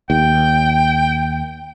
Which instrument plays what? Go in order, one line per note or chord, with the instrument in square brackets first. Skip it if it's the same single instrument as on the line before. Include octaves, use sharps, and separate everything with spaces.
[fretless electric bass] D#2 [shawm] G5